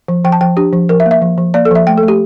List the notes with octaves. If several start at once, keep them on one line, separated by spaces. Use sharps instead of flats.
F3
F3 G5
A5
F3 G5
D4 G4
F3
F3 A#4
E5
A#3
E5
F3
F3
A#3 D5
A4
F3 E5
A3 G5
A4
A3
G4